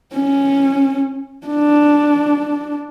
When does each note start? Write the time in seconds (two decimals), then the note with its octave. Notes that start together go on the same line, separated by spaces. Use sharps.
0.13 C#4
1.47 D4